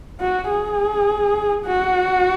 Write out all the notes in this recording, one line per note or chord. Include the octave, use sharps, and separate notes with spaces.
F#4
G#4
F#4